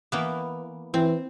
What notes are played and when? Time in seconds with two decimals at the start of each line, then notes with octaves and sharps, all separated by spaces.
0.12 E3 A#3 B3
0.94 E3 C4